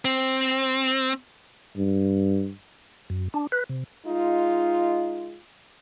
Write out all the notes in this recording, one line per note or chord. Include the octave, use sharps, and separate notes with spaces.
C4
G2
F#2
D4
B4
C3
G#3 D#4 F4